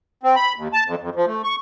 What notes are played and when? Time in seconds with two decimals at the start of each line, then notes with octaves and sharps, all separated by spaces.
0.23 C4
0.36 B5
0.56 D#2
0.73 A5
0.86 F2
1.00 F2
1.15 F3
1.26 A3
1.44 C#6